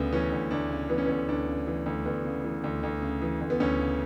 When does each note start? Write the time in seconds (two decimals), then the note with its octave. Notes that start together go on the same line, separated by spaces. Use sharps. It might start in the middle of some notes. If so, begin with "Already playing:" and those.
Already playing: D2 C#3 B3
0.13 E3 C#4
0.32 D2
0.51 D2 D4
0.70 C#3
0.89 E3 B3
0.98 C#4
1.05 D2 B3
1.28 D2 D4
1.48 C#3
1.67 E3
1.86 D2
2.06 D2 B3
2.25 C#3
2.44 E3
2.64 D2
2.83 D2
3.02 C#3
3.22 E3
3.41 D2
3.50 B3
3.60 D2 C#4
3.80 C#3